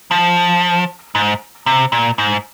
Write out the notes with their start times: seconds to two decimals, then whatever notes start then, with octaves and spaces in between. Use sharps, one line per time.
0.11 F3
1.15 G#2
1.66 C3
1.92 A#2
2.18 G#2